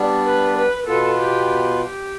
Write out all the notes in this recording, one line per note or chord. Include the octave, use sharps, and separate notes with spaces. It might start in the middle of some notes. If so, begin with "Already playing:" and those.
Already playing: G3 B3 D4
B4
B4
B2 B3 F4 A4 B4
G4
G4